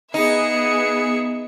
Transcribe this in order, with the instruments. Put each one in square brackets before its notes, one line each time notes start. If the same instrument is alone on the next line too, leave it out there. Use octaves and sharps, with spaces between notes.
[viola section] B3 G#4 [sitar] D#4 [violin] E5 C#7